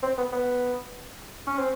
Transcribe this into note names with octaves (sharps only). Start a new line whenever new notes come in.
C4
B3
B3
C#4
C4